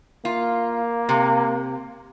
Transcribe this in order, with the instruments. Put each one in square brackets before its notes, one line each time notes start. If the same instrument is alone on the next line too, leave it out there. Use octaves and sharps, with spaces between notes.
[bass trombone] A#3 [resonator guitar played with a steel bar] F4
[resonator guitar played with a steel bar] C3